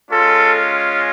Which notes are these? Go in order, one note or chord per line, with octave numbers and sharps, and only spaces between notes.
G#3 C#4 F4 A4